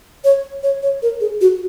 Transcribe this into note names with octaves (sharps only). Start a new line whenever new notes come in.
C#5
C#5
C#5
A#4
G#4
F#4